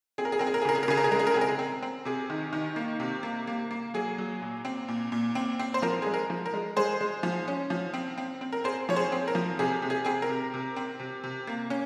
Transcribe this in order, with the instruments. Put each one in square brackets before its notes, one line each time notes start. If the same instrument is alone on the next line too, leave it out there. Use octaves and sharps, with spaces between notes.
[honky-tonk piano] C4 G#4
A#4
G#4
C4 A#4
G#4
A#4
G#4
C#3 A#4
G#4
A#4
C#3 G#4
A#4
G#4
G#3 A#4
G#4
A#4
C4 G#4
A#4
G#4
C4
C4
C3 G#4
D#3
D#3
A#3
C3
A#3
A#3
A#3
F#3 G#4
F#3
A#2
C4
A#2
A#2
C4
C4
C5
F3 A#4
G#3 G#4
A#4
F3
A#4
G#3
G#3 G#4 C5
G#3
F3
C#4
F3
C4
C4
C4
A#4
C4 G#4 C5
F3 C#5
G#4 C5
C4
A#4
F3
C3 G#4
C3
G#4
C4 G#4
A#4
C3
C3
C4
C3
C3
A#3
C#4